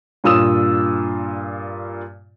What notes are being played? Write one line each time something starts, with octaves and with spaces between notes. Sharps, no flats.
G2 A#2 F4 D#6 E6 E7